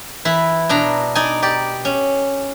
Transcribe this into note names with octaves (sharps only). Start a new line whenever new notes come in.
E3 E4
B2 D4 A#5
D#4 D5 G#5
G4 D5
C#4